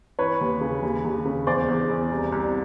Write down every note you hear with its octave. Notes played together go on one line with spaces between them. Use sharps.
E3 B4 C#5
D#2
C#3
D#2
D#2
C#3
E2 C5 D5
E2
E2
C2
C2